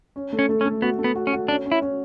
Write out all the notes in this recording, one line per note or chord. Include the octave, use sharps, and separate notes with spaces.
C#4
A3
C#4
A3
C#4
A3
B3 F#4
A3
B3
F#4
C#4
F#4
C#4 D4
C#4
E4
C#4